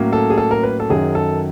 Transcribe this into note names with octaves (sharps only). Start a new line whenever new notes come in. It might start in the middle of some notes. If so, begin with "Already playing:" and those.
Already playing: A2 F#3 A#3 C#4
A4
G#4
A4
A#4
B4
A4
F#2 D#3 F#3 G#4
A4